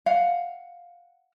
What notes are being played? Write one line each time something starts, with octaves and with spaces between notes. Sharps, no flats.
F5 F#5